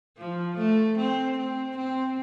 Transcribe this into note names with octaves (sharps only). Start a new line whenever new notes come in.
F3
A3
C4
C4
C4